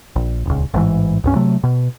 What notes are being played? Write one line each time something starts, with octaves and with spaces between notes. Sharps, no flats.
A#1
D#1 C#2
A1 G#2 C3 E3
C#2 G2 C#4
C3 F#3 A3
B2